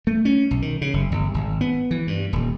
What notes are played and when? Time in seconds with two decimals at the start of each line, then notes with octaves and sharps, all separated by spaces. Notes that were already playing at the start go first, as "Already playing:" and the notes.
0.07 A3
0.25 C#4
0.51 B1
0.62 D#3
0.81 C#3
0.93 F#1
1.12 G1
1.34 G#1
1.61 B3
1.91 E3
2.07 G2
2.33 D#1